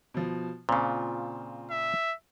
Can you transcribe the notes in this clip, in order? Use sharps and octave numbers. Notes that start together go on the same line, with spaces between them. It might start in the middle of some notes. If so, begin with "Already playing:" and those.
B2 F3
A#2 C#3 C4 F4
E5